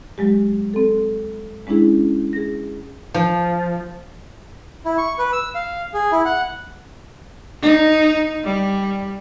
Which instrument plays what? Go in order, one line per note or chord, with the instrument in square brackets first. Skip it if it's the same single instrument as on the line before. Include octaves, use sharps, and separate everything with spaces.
[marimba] F#3 G#3 G4
C4 A4
G#3 C#4 D4 E4 G#4
G#4 A#6
[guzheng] F3
[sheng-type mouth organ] E4
C#6
B4
E6
F5
G#4
E4
F#5
[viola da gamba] D#4
G3